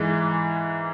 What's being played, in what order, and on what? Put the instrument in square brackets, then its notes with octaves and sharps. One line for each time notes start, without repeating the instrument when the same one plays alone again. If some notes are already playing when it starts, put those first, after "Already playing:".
Already playing: [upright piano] G#2 E3 G#3